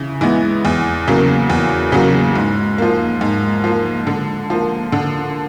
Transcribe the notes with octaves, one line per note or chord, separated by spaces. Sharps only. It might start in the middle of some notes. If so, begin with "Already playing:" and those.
Already playing: C#3 E3
E3 G#3 B3
E2
C#3 F#3 A#3
E2
C#3 F#3 A#3
G#2
F3 A#3
G#2
F3 A#3
D3
F3 A#3
D3